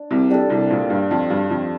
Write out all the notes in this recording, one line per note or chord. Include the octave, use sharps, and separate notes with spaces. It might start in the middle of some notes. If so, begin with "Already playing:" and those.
Already playing: D4
C2 C3
G3 D4 A4
C2 C3
A#1 A#2
G2
F2
G2
F2